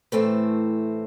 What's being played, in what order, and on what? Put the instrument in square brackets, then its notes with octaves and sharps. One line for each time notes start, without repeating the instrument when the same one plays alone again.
[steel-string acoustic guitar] A2 E3 A3 C4